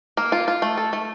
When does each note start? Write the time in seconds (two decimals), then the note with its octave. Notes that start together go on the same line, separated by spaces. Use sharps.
0.17 A#3
0.32 F4
0.48 F4
0.62 A3
0.78 A4
0.93 A3